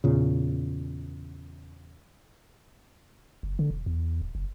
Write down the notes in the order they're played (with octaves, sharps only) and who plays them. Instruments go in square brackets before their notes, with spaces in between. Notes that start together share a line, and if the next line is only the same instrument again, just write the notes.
[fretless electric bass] E2 A#2 C#3
[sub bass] F#1
D3
E1
E2
D1
F#1